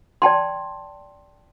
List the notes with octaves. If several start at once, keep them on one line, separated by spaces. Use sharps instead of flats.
D5 G5 A5 C6